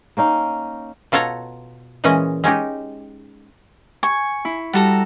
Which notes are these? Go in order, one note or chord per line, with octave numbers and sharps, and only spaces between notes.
A#3 C#4 D#4
B2 F4 A4 C#5 A#5
A#2 E3 G#3 C#4 D#5
G#3 C#4 D#4 G4
G#5 C#6
E4
G3 F#4 A4 A#5